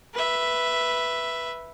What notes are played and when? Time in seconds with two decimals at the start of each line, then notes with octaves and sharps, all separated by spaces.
0.14 B4 E5